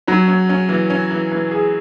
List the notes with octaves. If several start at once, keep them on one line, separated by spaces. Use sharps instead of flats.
F#3 C#4
C#4
C#4
E3
C#4
E3
E3
G#4